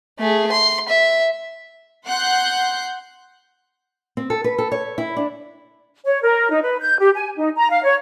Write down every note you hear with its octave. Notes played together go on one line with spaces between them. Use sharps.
A3 G#4
C6
E5
F#5 C6 F#6 G6
C4
A4
B4
A4
C#5
E4
D4
C#5
A#4
D#4
B4
G6
G4
G#5
D#4
A#5
F5
C#5